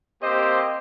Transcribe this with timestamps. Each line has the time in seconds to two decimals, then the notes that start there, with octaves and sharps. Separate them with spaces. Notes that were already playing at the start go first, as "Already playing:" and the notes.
0.23 A#3 C4 G4 C5 D#5